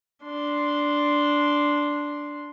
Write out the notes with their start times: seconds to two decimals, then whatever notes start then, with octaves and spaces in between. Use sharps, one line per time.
0.24 D4 C6